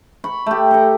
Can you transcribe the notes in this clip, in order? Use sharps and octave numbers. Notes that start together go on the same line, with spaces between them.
B5 C#6
A3 G4
A4 A#5